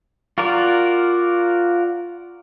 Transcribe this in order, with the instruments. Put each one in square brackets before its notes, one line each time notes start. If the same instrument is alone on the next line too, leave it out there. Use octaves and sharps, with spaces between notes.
[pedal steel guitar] F4 F#4 A#4 D5